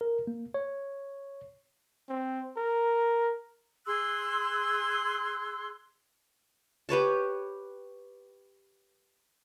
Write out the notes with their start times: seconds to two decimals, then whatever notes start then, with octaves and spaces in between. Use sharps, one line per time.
0.01 A#4
0.27 A#3
0.54 C#5
2.09 C4
2.57 A#4
3.86 G#4 C6 E6 F#6
6.89 G4 B4 C#5 A5